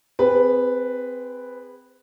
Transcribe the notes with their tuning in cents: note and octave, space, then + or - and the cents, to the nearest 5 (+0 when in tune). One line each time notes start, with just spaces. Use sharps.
C4 -25 G#4 -25 B4 +0